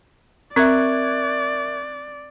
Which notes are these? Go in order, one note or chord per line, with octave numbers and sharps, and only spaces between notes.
C4 A#4 D5 E5 C#6 F#6 G#6